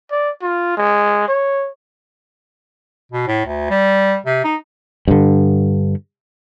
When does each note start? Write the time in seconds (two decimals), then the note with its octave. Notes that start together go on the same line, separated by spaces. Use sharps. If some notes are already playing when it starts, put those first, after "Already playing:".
0.11 D5
0.42 F4
0.77 G#3
1.28 C#5
3.12 B2
3.27 A2
3.46 D2
3.70 G3
4.26 C3
4.44 D#4
5.08 G2 D3